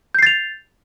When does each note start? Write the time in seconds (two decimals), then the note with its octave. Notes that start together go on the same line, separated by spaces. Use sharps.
0.15 G6
0.19 C7
0.23 A6
0.27 F7